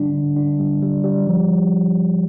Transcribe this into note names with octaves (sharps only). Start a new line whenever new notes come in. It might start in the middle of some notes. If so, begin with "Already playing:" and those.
Already playing: D3 G3 D4
D3
D4
G3
G3
G3
F3